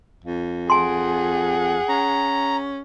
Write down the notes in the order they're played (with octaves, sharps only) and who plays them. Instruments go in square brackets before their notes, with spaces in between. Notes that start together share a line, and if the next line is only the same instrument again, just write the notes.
[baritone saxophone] F2
[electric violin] G#4 F#5 [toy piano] G#5 C6
[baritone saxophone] C#4 [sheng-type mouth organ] A#5